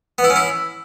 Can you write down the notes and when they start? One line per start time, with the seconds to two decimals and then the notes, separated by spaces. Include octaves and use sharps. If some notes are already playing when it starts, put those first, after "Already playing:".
0.18 B3
0.24 E4
0.30 C#4
0.36 E4